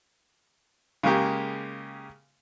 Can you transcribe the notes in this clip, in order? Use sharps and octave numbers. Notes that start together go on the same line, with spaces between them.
C#3 G#3 A#3 G4